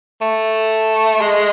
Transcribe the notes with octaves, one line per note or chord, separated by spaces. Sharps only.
A3
G#3